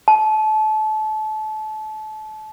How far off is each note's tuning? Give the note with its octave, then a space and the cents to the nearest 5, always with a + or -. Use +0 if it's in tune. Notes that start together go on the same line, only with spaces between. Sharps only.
A5 -30